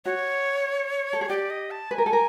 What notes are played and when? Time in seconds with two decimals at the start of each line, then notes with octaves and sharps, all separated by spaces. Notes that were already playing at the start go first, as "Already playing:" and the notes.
0.05 F#4 C#5
1.13 A4
1.21 G#4
1.29 G4 D5
1.50 D#5
1.71 A5
1.91 B4 G#5
1.98 A#4
2.06 A4
2.13 A#4